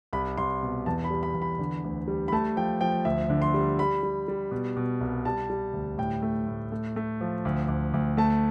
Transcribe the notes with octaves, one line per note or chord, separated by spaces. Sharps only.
C2 B5
C2 C6
B2
E2 A5
B5
G3
B5
E2
B5
D3
D2
G3
B5
A3 A5
F3 G5
F3 G5
D2 E5
D3
C6
G3
G3 B5
G3
G3
B2
B2
C2
G3 A5
G3
D2
A2 G5
A3
A2
A3
A3
F3
D2
D2
D2
A3 A5